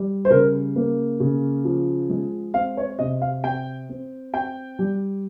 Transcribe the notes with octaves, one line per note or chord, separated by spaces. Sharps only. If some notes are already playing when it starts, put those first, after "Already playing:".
Already playing: G3
C5
C#3 A#4
A#3
C#3
F3
G#3
C4 F5
C#5
C3 D#5
F5
C4 G5
C4
C4 G5
G3